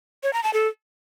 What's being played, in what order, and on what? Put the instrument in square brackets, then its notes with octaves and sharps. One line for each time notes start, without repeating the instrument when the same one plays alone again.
[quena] C#5
A#5
A5
A4